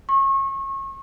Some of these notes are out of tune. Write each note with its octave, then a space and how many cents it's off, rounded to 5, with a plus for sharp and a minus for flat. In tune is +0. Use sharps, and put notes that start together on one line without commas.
C#6 -30